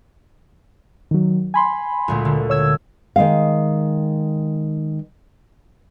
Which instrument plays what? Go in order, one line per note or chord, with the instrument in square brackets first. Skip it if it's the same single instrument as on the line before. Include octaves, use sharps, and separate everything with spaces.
[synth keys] D#3 F#3
G#5 B5 C6
[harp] D2 A#2 G#3
D3
[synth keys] C#5 E6 G#6
[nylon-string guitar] D#3 G#3 F5